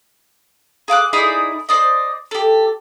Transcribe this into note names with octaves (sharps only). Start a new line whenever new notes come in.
G#4 F5 D6 F#6
D#4 E4 G#4 D5
C5 D5 D#5
G4 A4